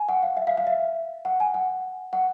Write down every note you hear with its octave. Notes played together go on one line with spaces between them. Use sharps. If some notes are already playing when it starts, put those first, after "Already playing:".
Already playing: G#5
F#5
F5
E5
F5
F5
E5
F#5
G#5
F#5
F#5